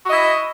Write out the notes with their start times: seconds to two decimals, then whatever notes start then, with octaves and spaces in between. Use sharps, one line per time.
0.05 F#4
0.09 D#5
0.12 E4